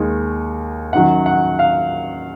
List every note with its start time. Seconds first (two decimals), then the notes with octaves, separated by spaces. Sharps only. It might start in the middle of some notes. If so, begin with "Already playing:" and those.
Already playing: D#2 D#3 G#3
0.93 F#2 D#3 F#3 F#5
1.26 F#5
1.59 F5